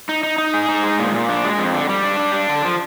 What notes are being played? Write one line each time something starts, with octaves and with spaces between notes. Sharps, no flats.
D#4
D#4
D#4
G#4
D#4
G#3
A#2
A#2
D4
G#3
F2
D3
G3
D4
G3
D4
D3
F3